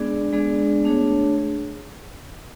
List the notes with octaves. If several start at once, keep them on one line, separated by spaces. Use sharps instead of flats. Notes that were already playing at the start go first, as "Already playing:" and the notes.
Already playing: G#3 B3 D4 G#4 D5
G#3 B3 D4 G#4 D5
A3 D4 G#4 C#5